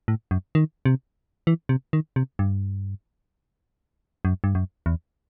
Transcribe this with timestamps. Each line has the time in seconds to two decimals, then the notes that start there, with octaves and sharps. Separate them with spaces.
0.08 A2
0.31 F#2
0.55 D#3
0.85 C3
1.47 E3
1.69 C3
1.93 D#3
2.16 C3
2.39 G2
4.25 F#2
4.44 G2
4.55 F#2
4.86 E2